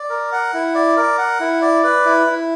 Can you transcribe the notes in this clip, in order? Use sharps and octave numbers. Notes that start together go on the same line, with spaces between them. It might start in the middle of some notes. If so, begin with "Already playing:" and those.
Already playing: D5
A#4
F#5
E4
D5
A#4
F#5
E4
D5
B4
E4
E4